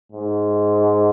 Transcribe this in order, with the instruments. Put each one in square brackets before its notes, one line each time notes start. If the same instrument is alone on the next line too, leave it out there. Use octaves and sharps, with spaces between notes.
[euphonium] G#2